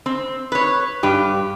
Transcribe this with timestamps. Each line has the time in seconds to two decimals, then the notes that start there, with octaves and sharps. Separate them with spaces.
0.06 C4
0.52 B4 C#5
1.03 G2 G4